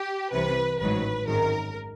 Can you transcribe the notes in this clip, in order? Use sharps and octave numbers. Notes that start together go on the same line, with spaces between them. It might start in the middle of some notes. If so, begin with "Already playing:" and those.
Already playing: G4
C2 C3 E3 B4
A1 G#2 D#3 F#3 B4
G#1 F#2 D#3 A#4